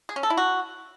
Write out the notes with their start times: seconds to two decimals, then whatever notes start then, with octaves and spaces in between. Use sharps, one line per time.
0.09 G#4
0.16 C#4
0.23 A4
0.30 E4
0.37 F#4